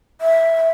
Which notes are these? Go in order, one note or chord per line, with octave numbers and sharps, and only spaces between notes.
E5